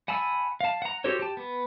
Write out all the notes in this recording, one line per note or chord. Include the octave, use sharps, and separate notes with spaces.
F#5 G#5 A5 B5 E6
F5 A5
F#5 A#5
F#4 G4 A4 C5 C#5
G4 A5
B3